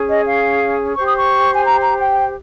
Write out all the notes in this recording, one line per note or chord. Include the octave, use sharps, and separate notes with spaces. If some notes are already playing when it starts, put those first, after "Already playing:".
Already playing: C#4 G#4
D#5
F5
G4 C5 C#6
D#6
C#6
G#5
A#5
A#5
G5